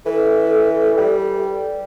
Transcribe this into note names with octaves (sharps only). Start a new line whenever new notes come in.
E3 A4
G3